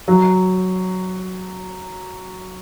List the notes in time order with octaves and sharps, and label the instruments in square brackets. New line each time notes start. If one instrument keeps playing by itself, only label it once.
[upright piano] F#3